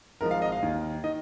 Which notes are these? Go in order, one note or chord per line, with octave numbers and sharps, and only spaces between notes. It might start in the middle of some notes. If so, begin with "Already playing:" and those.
G#1 G#2 F3 A#4
F5
D#5
F5
D#2 D#3
D#3 D#5